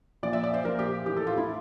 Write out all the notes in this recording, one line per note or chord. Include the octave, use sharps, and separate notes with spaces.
A#2 F3 D5
E5
D5
C5
A#2 F3 A#4
G4
A2 E3 G4
A4
F4
E4